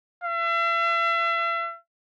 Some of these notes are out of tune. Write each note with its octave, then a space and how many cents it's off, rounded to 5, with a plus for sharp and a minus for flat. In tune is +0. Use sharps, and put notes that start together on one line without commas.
E5 +40